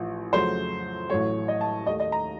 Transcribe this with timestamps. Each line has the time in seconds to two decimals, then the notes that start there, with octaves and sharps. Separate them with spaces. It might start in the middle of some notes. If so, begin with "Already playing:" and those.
Already playing: A1 A2 F3
0.33 F2 C#3 F#3 A3 C5
1.10 A1 A2 F#3 A3 C#5
1.48 D#5
1.61 A5
1.86 D#2 D#3 A3 D#5
2.00 D#5
2.12 A#5